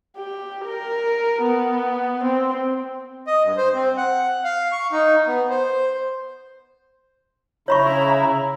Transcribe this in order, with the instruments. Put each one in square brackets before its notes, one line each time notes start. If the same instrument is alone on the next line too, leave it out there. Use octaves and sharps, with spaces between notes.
[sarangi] G4
A#4
B3
C4
[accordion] D#5
G2
C5
C4
F#5
F5
C#6
D#4
B3
C5
[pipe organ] C#3 E4 [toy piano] C#5 B5 C#6 [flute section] A#5